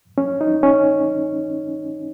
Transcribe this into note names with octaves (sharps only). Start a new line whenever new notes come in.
C#4
D#4
C#4